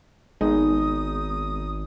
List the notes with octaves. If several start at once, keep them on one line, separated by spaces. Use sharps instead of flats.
G#1 G#3 B3 D#4 G#4 D#6